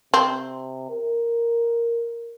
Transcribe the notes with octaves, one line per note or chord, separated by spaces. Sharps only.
C3 C4
A#4